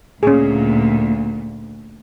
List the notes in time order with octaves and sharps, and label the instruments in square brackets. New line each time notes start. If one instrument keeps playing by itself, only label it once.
[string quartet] D2 [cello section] A#2 [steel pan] C#4 G#4